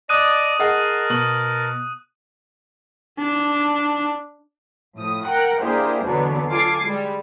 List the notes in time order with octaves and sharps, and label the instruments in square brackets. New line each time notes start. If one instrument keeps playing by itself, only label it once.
[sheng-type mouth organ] D5 D#5 A5 [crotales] D#6 F#6 D#7
[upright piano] G#4 D#5 F#5 [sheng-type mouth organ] A#4 A5
[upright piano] B2 F#7
[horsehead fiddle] D4
[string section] A2 F3 D#6
A#4 F#5 G5
A#3 D4 E4 G4 G#4 C5
E2 B2 D3 F#3 B3 D4
F4 A4 G#5 D6 C7
G3 G#3